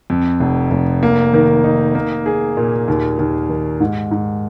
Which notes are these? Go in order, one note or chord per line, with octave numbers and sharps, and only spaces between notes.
F2
F1
F1
A#3
D#3
D#4
A#3
G#4
A#2
D#2
D#2
D#3
G#2
G#2